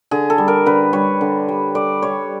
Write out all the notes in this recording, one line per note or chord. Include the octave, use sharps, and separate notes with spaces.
D3 G#4
A4
G3
A#4
D3 B4
G3 C#5
D3
G3
D3 D5
G3 C#5